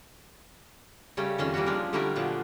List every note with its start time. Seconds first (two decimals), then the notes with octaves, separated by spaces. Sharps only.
1.17 C#3 G3 A3 C#4
1.38 F2 D#3 C#4
1.54 E3 G3 A#3 C#4 F#4
1.66 F3 G#3 B3 D4 A#4
1.93 D3 G3 A3 D4 E4 A#4
2.16 A#2 F3 F#3 B3